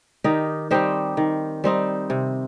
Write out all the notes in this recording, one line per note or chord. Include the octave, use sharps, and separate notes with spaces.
D#3 D#4 G4
G3 C4 D#4 G4 C5
D#3
G3 C4 D#4
C3